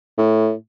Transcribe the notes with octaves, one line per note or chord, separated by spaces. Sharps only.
A2